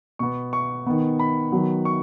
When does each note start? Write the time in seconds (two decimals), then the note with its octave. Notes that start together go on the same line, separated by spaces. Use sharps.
0.19 B2 B3 C#6
0.53 C#6
0.86 D#3 B3
1.19 B5
1.52 D#3 F#3 B3
1.85 C#6